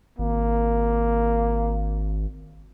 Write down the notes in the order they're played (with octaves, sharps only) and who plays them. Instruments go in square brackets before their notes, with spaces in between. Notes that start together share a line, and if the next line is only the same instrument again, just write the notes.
[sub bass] G#1 [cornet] A#3